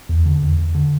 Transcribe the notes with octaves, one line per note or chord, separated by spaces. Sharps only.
E2
D3
E2
E2
D3